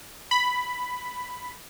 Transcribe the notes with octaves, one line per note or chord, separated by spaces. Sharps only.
B5